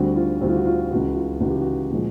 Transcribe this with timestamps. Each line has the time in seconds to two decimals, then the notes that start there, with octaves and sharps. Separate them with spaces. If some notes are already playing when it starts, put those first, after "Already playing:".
Already playing: D2 D3 G3 C4 F#4
0.16 F4
0.41 D2 D3 G3 C4 F#4
0.49 F4
0.57 F#4
0.66 F4
0.91 C#2 C#3 E3 F#4
1.16 F4
1.41 C#2 C#3 E3 F#4
1.50 G4
1.60 F#4
1.90 A#2 F3 G#3